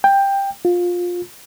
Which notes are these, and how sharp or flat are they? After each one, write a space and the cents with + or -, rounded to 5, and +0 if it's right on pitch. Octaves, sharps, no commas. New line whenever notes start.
G5 +10
F4 +15